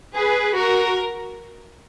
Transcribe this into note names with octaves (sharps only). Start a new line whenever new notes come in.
G#4 B4
F#4 A#4